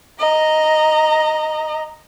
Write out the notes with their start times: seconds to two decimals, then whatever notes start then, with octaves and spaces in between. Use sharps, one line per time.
0.20 D#5 A#5